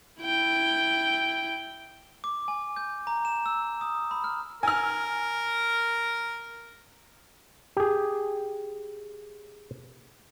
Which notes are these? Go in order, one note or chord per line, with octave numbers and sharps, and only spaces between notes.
E4 G5
D6
G#5
G6
A#5
E7
E6
D#6
B5
F6
A#4 G#5 F6
G4 G#4